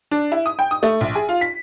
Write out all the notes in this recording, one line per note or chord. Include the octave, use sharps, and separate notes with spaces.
D4
E4
D#6
G5
D#6
A3
A#1
G#4
F4
B6